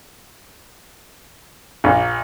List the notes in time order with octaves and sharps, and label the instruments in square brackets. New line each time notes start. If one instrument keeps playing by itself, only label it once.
[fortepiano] A#1